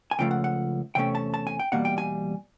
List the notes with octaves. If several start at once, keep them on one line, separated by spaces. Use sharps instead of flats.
G#5
C#2 C#3 F3 A3 G5
F#5
F#5
E2 C3 A3 C#4 G5
A5
A5
G#5
G5
E2 B2 G3 A#3 F#5
G5
G#5